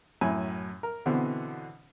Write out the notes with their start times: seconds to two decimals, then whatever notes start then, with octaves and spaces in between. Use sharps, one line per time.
0.21 F#2 A2 E4 G#5 B5
0.83 A#4
1.06 B2 D3 E3 B3 C4